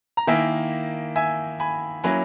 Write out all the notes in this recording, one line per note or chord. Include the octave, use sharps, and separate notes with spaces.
A#5
D#3 A#3 E4 E5 G#5
E5 G#5
G#5 B5
F#3 A#3 C#4 E4 G#5 B5